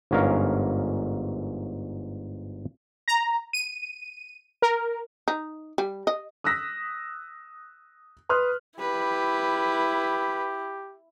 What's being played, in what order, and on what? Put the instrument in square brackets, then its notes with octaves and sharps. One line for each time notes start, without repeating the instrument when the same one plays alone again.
[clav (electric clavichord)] G1 G#2 C#4 A#4 F5 A#5
[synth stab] A#5
D#7
A#4
[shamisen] D#4
G3
D#5
[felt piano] D#6 E6 F#6 A#6 B6
B4 C6 D#6 F6 F#6
[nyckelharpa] E4 [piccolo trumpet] G4 [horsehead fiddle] B4